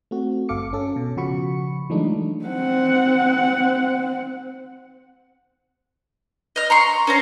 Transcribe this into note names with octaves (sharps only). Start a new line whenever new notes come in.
A3 C4 F#4
G1 A4 F5 D6 C#7
C#4 A4
B2
C#3 F3 F#4 B5 C#6 C#7
E3 F#3 G#3 A3 D4 D#4
C4 F#5
D#5 F6
A#5 C6 C#6
C#4 C5 A#5